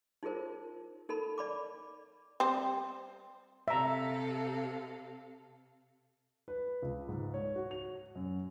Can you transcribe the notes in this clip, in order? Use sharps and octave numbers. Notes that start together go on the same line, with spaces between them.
D#4 F4 G#4 A#4 C5
D#4 A4 A#4 B5
D5 B5 D6
G3 C4 C5
C3 A4 E5 F5 A#5
B4
C#2
G#2
C#5
F#4
F7
F#2